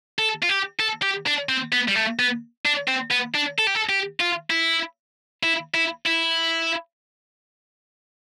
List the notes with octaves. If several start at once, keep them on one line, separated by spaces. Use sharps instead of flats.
A4
F4
G4
A4
G4
D4
C4
B3
G3
A3
B3
D4
C4
B3
D4
A4
G4
A4
G4
F4
E4
E4
E4
E4